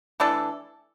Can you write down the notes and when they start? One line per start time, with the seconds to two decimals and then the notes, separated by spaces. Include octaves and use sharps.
0.20 E3 A3 D4 A4